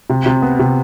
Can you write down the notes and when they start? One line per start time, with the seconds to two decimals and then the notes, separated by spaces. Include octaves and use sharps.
0.10 C3
0.26 C3
0.42 B3
0.59 C3